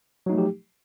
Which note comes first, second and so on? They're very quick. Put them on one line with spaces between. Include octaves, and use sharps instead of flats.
F#3 D#4 A3 F3 G4